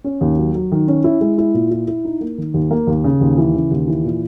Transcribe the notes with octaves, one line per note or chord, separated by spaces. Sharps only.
C#4
D#2
F#3
F#3
D#3
C#4
E4
G#3
E4
A#2
E4
E4
D#4
A#3
D#3
D#2
A#3
D#2
C#3
D#2
E3
C#3
D#2
E3
A#2